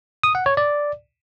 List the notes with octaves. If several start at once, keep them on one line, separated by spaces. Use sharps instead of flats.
D#6
F#5
C#5
D5